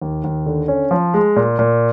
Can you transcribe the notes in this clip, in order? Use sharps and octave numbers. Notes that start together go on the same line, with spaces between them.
D#2
D#2
D3
C#4
F3
G#3
A#2
A#2